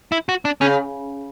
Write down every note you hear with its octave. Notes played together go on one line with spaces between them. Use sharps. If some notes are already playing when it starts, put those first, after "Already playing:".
E4
F#4
D4
C#3 C#4